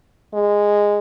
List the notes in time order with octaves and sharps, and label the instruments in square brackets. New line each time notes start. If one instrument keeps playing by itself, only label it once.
[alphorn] G#3